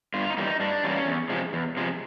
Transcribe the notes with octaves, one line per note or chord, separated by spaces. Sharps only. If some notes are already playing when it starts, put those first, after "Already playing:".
G2 F4
D#4
E3 G3 A#3
D#4
G2 D4
E3 G3 A#3 C#4
E2
C3 F3 G#3
E2
C3 F3 G#3